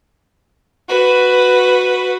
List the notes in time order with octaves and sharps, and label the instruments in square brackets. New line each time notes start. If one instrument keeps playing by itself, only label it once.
[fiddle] F#4 B4